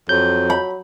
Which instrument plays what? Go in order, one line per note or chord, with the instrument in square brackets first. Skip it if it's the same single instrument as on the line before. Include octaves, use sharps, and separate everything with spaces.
[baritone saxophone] F2 [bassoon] F#3 [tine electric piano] G6
[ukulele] B5